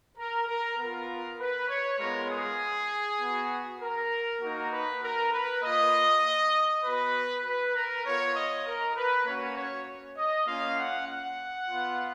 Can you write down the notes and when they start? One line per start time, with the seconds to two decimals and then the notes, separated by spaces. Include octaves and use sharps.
0.18 A#4
0.48 A#4
0.78 B3 F4 A#4
1.39 B4
1.69 C#5
1.99 G#3 B3 F4 A#4
2.30 G#4
3.20 B3 F#4
3.81 A#4
4.42 A#3 D#4 F#4 A#4
4.72 B4
5.03 A#4
5.32 B4
5.63 A#3 F4 D#5
6.84 B3 F#4 B4
7.45 B4
7.75 A#4
8.05 B3 F4 C#5
8.35 D#5
8.66 A#4
8.96 B4
9.26 A#3 C#4 F#4 C#5
9.56 C#5
10.17 D#5
10.47 A#3 C#4 F4 F5
10.78 F#5
11.08 F#5
11.68 B3 F4